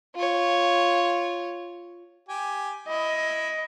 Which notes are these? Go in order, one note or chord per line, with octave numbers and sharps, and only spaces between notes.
F4 C#5
G4 G#5
E4 D#5